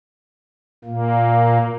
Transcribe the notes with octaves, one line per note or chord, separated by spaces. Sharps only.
A#2 A#3